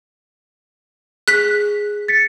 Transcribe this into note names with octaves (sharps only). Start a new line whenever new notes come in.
G#4 F#6 B6
A6 B6 C#7